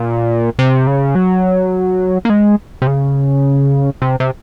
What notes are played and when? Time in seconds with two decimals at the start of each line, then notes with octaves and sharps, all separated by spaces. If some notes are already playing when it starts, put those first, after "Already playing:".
Already playing: A#2
0.59 C3
0.87 C#3
1.15 F#3
2.25 A#3
2.30 G#3
2.82 C3
2.87 C#3
4.02 C3
4.20 C3